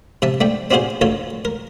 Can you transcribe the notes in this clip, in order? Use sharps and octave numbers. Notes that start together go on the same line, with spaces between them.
C3 E5 A5
A3 D4 G5
C4 D4 F4 F#4 G#4 C5
D2 F4 A4 C#5
A#4